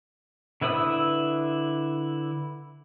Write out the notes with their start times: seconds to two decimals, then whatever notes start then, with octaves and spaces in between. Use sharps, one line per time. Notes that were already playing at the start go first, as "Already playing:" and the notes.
0.61 D3 E4 B4 D#6 E6